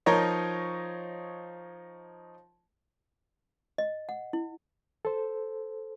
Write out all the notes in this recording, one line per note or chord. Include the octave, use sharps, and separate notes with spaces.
F3 D#4 A#4 C#5 D#5
D#5
F#5
E4
A4 C5